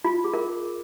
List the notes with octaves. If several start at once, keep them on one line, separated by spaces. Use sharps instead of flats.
F4
G#4
A#4